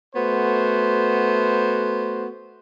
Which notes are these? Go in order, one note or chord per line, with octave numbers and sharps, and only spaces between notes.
A3 B3 F#4 C5